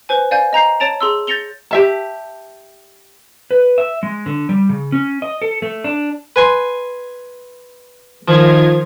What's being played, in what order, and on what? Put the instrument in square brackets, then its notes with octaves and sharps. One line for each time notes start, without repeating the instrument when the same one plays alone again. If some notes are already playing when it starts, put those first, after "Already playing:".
[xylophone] B4 C5 G#5
D5 F5 G#5 G6
D#5 A#5 G6 C7
C#5 A5 A6 D7 F7
G#4 C6 E6
G6 A6 A#6 C#7 F7 G7
[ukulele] G4 E5 A5
[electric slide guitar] B4
E5
G#3
D3
G3
C#3
C#4
D#5
A4
A3
D4
[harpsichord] B4 G#5 C6
[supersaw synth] D#3 F4 G#6 [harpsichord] F3